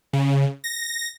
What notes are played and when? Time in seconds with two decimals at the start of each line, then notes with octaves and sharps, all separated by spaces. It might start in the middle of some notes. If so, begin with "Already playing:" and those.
0.13 C#3
0.64 A#6